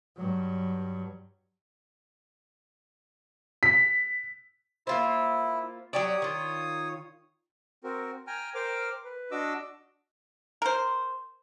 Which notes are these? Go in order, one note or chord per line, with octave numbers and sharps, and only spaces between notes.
G2 F#3
B6
A#3 E4 F4 C5
F#3 G4 C#5 D5 D#6
D#3 F4
C4 F#4 A#4
G5 G#5 A#5 F6
A#4 C5 G5 D6 F6
B4
D4 F#4 D#5 D6 E6
A#4 C5